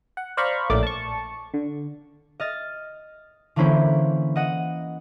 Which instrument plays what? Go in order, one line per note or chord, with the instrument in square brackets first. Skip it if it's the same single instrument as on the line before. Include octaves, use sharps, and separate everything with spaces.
[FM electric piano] F#5
C5 D5 F5 A#5 B5 C#6
A#1 A2 A3 A#4 D5 D6
A5 C#6
D3
[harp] D#5 F6 A6
D3 E3 A#3 C#4 E4 C5
D#5 F#5 D#7